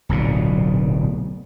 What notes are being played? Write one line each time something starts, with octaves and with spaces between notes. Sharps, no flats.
D1 B1 A#2